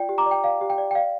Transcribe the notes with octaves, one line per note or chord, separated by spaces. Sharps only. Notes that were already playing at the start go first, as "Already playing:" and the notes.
Already playing: F4 D5 G5
G4
A#5 D6
D5
G5
D5 F5
G4
G5
D5
G5
D5 F5